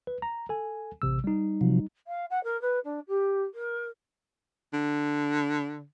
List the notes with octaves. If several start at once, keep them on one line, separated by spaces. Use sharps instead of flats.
B4
A#5
A4 G#5
A1 C3 E6
G3 D#4
C3 F3 F#3
F5
F#5
A#4
B4
D4
G4
A#4
D3